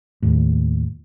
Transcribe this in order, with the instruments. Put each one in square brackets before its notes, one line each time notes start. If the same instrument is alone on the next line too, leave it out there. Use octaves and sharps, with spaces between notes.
[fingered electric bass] D#2 A2